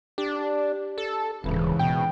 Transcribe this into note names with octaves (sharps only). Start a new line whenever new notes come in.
D4 G4
A4
D#1 G#2 C#3 E3
B2 G5